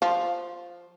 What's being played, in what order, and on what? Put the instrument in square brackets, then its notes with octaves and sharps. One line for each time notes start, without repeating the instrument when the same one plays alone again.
[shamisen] F3